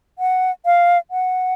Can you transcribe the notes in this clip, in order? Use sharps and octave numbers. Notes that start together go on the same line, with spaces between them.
F#5
F5
F#5